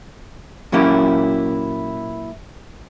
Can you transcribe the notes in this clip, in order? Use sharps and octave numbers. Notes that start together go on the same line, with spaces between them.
A#2 F#3 A#3 C#4 E4 G4